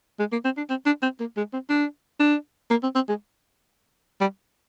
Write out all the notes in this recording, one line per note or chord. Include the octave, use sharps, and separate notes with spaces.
G#3
A#3
C4
D4
C4
D4
C4
A#3
G#3
C4
D4
D4
A#3
C4
C4
G#3
G3